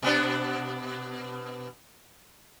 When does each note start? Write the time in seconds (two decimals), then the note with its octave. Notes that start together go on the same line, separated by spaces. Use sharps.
0.02 B2 B3 D4